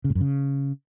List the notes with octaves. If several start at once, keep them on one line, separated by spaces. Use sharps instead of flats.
C#3
A2
F#2
C#3